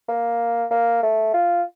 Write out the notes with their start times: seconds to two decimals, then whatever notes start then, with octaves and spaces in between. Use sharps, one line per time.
0.08 A#3
0.71 A#3
1.03 A3
1.34 F4